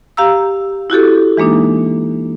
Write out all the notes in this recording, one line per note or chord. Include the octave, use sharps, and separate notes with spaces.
G4 F5 A#5 E6
E4 F#4 G4 A4
E3 G#3 A#3 D4 D#4